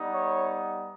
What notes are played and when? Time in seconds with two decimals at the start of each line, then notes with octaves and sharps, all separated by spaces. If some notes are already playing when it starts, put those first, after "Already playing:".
Already playing: G3 B3 D#4
0.14 C#5